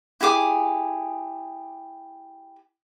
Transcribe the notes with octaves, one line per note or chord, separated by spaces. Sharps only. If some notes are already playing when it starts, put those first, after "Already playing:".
E4 G4 G#4 D6